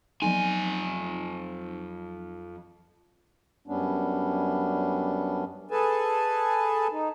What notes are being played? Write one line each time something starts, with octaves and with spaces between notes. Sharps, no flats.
F2 F3 F#3 D#4 G#5
F#2 G3 B3 C#4 D4
G#4 A4 B4 G#5 A5
D#4